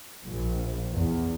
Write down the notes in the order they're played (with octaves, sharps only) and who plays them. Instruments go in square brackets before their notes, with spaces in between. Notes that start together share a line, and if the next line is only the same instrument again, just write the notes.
[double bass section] A#1
E2